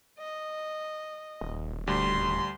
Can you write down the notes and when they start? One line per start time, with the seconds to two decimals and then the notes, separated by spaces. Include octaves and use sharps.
0.19 D#5
1.41 D#1
1.87 D2 G3 C6